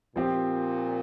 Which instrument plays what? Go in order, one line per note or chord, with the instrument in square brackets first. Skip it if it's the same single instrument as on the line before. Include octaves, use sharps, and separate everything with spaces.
[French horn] A#2 [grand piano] F3 C4 G4